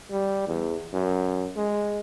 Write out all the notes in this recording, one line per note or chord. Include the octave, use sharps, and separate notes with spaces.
G3
E2
F#2
G#3